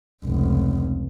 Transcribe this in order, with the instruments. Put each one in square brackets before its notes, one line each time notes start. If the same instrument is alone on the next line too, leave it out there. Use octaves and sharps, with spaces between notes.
[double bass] F1 C#2